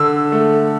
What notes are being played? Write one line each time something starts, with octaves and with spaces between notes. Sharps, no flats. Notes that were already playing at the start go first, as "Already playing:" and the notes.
Already playing: D3 E6
A3